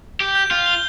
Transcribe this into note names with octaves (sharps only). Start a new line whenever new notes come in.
G4 G6
G6
F4 G6
G7